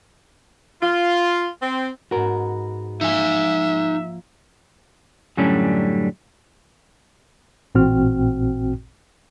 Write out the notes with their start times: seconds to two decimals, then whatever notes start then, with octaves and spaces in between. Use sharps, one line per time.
0.82 F4
1.61 C4
2.11 G#2 B3 F#4 A#4
3.01 F3 A#3 D#4 E5 G#5
5.37 F#2 A2 D3 G3 C#4 D4
7.75 A1 A#2 C4 F#4 G5 F6